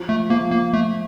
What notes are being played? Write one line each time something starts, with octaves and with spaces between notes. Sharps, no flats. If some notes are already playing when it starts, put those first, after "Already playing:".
Already playing: F3
A3
F3 A#3
A#3
A3